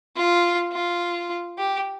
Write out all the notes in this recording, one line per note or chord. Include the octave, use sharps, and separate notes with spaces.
F4
F4
G4